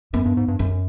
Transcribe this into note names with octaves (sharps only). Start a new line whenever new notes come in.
F#2 B3
G2
G#2
G2
F#2 C#4